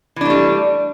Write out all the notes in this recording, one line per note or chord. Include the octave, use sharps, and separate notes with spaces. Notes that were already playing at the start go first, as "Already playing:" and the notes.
E3 G3 A3 D4